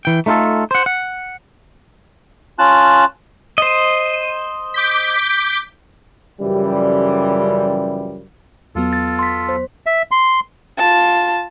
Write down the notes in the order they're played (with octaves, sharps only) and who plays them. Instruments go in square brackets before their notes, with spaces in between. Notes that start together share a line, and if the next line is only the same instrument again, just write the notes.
[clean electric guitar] E3 G5
A3 D#4 F4 G#4 A4
C5 F#5
F#5
[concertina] C#4 F4 A5 F#6
[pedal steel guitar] C5 D#5 [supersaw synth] D#7
[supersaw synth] D6 G6 B6
[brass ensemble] F#2 C#3 E3 F3 G3
[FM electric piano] E2 F#3 B3 [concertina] F4 A4
[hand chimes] A6
C6 B6
C5
[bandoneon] E5
C6
[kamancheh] F4 A5